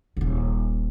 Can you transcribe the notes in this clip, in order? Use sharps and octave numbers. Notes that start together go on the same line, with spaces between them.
D#1 G#1